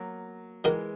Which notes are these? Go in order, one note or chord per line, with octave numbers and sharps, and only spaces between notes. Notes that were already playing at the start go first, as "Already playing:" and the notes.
Already playing: F#3 A#3
D#3 E3 G#3 A#3 D#4 F#4 A#4